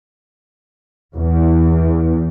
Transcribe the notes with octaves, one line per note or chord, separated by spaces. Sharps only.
E2